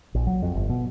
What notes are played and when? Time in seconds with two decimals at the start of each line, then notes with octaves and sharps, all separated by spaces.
0.15 A#1
0.27 F#3
0.42 F2
0.54 G1
0.69 B2